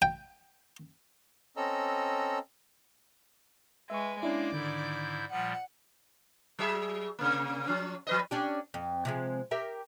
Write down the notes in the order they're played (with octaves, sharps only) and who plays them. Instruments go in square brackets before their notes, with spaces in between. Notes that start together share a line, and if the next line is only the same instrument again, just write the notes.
[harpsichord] G5
[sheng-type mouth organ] C4 C#4 A4 D#5 A#5 E6
[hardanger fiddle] G#3 B4 [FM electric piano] E5 C#6
[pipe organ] G#3 A#3 [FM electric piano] C#4 D4 E4 [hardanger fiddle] D5
[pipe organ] G#2 E4 G6 [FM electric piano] D3 D#3
[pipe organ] A#2 F3 G3 [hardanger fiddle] F#5
[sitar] F#3 G#4 E5
C3 A#3
F3 C#4
F3 B4 D#5
[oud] C#4 D4 G4
F2
C3 F3 G#3
G4 A#4 E5